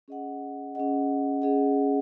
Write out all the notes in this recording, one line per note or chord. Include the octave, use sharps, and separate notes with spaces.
C#4 G#4 D#5 F#5
C#4 G#4 D#5 F#5
C#4 G#4 D#5 F#5